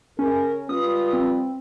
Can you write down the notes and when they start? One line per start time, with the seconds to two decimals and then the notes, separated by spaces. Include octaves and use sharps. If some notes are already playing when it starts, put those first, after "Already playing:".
0.19 C#3 C#4 G#4 A#4
0.69 G3 F4 B4 D#6
1.13 C4